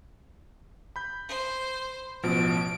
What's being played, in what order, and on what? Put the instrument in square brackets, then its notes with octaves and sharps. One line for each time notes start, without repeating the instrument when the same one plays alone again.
[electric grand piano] B5 G6
[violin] C5
[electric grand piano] A1 B2 F3 [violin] D7